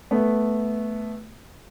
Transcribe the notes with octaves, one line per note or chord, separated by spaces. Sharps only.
A3 B3